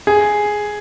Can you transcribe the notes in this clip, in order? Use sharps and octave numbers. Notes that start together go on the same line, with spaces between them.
G#4